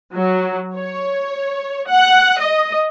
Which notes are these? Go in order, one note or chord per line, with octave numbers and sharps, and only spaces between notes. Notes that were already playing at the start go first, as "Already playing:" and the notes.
F#3
C#5
F#5
D#5